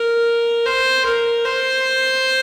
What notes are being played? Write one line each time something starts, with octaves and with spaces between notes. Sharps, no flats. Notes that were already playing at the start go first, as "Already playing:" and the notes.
Already playing: A#4
C5
A#4
C5